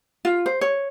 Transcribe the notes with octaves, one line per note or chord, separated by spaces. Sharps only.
F4
C5
C#5